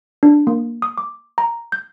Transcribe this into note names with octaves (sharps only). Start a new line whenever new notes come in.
D4
A#3
D#6
D6
A#5
G6